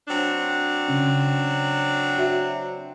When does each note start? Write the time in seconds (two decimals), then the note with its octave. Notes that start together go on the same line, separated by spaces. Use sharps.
0.07 F#3 C4 D4
0.88 C#3 C#4
2.18 F#4 E5